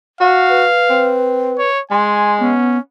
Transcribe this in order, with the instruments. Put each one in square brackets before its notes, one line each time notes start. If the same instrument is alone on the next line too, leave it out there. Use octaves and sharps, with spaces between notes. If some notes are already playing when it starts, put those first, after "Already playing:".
[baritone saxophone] F#4 [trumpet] F5
[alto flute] B4
[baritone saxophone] C4
[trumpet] C#5
[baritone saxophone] G#3 [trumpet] G#5 [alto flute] C6
[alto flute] B3 [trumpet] C#4